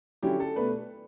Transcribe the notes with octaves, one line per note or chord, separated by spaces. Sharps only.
D3 F#3 C#4 E4 G4
A4
B2 A3 D4 B4